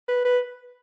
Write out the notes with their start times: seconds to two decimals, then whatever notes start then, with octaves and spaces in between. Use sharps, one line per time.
0.08 B4
0.25 B4